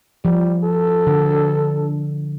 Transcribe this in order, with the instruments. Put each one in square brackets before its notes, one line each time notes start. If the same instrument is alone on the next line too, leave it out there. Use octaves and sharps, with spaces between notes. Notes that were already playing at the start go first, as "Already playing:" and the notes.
[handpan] F3 [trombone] G3
[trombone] A4
[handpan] D3